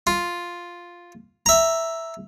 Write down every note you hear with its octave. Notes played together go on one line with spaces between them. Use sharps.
F4
E5 A#5